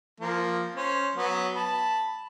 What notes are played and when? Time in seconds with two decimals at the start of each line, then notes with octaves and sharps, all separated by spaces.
0.20 F3 A#3
0.76 C#4 C5
1.16 F#3 B3 B4
1.55 A5 B5